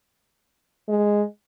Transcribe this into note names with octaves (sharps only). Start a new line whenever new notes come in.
G#3